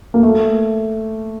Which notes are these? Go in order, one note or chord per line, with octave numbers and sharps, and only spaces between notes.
A#3
A3